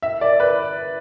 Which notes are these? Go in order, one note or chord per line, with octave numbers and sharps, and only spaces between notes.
E5
D5
B4